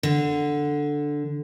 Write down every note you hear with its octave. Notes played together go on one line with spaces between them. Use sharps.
D3